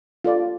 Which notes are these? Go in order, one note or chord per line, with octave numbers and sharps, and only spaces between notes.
F4 A4 D5